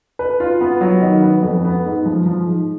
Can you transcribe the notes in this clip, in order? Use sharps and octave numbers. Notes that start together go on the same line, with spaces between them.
B4
F4
B3
F#3
D#3
B3
F2
B3
G#2
F3
F3
G#2